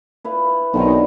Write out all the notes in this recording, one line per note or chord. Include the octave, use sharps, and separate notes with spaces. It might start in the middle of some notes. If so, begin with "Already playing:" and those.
E4 B4 F5
B1 D3 D#3 F#3 C4 D#4